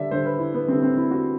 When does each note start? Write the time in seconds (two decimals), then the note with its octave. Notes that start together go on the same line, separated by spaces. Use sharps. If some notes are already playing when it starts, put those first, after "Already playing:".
Already playing: D3 G3 D5 E5
0.11 D3 G3 C5
0.26 B4
0.39 E4
0.54 B3
0.68 D3 G3 C4
0.82 C4
0.97 E4
1.11 F#4